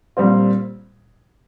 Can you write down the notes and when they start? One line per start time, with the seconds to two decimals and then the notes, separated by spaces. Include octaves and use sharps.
0.17 A#2 G3 C4 F4